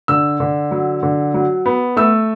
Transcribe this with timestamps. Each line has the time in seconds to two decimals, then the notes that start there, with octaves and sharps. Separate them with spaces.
0.08 D3 E6
0.40 D3
0.71 F#3
1.03 D3
1.34 F#3
1.66 B3
1.97 A3 E6